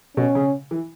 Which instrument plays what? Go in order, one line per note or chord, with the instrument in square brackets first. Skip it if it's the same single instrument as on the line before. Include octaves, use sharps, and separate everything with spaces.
[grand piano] B2 [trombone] C#4
[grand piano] C#3
E3